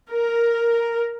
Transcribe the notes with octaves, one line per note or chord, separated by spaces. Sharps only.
A#4